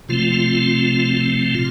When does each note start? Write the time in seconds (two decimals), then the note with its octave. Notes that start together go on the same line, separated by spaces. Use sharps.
0.09 C3 F3 A3 C4 F4
1.55 A#2 F4